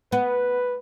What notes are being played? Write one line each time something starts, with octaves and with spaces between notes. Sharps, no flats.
B3 B4